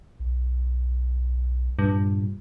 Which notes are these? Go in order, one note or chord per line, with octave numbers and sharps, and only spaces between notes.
B1
G2 A#2